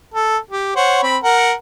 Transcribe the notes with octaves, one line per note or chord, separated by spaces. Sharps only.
A4
G4
C5 C#5 F#5
C4 B5
A#4 F#5